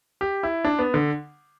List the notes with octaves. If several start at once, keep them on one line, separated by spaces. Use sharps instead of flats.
G4
E4
D4
B3
D3